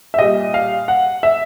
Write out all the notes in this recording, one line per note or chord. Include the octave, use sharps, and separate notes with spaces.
E5
A#2 G3 D#5
F5
F#5
E5